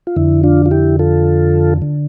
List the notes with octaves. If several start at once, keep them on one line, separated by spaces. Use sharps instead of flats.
F4
F2 D3 E4
D4 F4
F4
E4 G4
F4 A4
D3